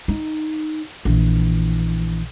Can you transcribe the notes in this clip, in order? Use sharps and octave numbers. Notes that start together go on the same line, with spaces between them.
D#4
A#1 E3